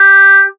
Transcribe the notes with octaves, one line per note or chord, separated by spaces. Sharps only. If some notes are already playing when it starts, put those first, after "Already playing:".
Already playing: G4